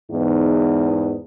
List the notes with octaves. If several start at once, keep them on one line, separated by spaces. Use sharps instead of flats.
E2 G#2 E3 B3 D#4